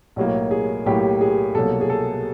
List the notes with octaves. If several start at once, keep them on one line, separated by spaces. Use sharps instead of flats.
B1 A2 F#3 A#3
G#4
B1 A2 F#3 A#3 G4
G#4
C2 B2 F#3 A#3 A4
G#4
A4